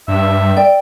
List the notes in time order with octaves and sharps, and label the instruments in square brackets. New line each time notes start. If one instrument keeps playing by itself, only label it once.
[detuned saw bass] G2 [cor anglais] E5
[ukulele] D5 G5